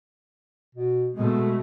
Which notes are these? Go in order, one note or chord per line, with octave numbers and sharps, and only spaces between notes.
B2
B2 G#3 A3